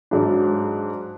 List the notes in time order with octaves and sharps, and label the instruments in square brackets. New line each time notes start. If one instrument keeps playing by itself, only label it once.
[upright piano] G#2 F#3 D4